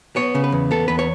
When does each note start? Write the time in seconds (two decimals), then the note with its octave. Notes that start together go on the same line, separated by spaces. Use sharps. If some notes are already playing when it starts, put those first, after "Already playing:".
0.16 B3 C#5
0.35 C#3
0.44 B4
0.52 E2
0.71 B3 A4
0.88 E2 B4
0.99 C#5